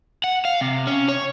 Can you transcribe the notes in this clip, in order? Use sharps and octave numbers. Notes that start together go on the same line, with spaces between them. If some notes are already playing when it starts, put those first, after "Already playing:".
F#5
F5
C3
C#4
C#5